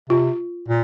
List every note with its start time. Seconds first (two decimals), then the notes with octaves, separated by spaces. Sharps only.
0.09 C3 F4
0.68 A#2